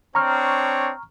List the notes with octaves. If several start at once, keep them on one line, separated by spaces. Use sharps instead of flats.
C4 D4 C#5 A#5 C#6 F6